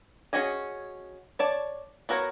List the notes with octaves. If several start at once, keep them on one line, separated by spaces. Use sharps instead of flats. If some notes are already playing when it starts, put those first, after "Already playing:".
C#4 F#4 G#4 D#5 G#5
C#5 D5 A5
B3 F#4 A#4 C5 C#5